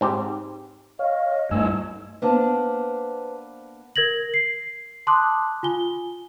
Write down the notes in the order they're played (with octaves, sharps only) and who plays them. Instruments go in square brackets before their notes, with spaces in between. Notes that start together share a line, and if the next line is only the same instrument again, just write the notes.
[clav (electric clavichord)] G#2 C4 G4
[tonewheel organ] C#5 F5 [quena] D#5
[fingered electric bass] G2 A3 [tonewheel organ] G#5 E6
[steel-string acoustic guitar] A#3 B3 D4 [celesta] B4 C5 A5
[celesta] A#4 G#6 A#6 F#7
C7
A5 C6 D6 D#6 F#6
F4 G#5 G7